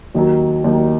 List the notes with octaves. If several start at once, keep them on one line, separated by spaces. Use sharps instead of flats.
D#2 D#3 F#3
D#2 D#3 F#3